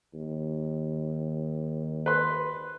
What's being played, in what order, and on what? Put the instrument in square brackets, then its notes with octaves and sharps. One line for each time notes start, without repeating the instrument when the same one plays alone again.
[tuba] D#2
[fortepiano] B4 C6